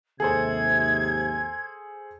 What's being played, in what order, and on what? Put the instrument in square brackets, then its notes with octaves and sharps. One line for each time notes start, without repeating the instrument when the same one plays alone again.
[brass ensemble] D#2 G#2 C3 [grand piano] G#4 A4 C5 [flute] G#6